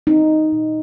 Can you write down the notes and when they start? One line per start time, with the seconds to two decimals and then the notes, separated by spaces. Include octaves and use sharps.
0.07 C4 D#4
0.52 A#2